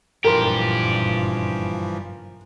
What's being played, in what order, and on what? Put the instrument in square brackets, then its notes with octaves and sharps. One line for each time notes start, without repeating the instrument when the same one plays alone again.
[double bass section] F#1 A#2 [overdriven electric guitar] G2 G4 [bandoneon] E3 F3 [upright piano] A#4 C6